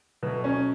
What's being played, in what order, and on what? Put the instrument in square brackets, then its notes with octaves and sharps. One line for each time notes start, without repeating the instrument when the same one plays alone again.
[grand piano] B2 F#3 A3 [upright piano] B3
[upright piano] C#4